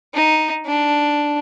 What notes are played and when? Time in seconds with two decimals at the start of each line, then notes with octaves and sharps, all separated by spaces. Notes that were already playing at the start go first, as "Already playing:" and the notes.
0.14 D#4
0.66 D4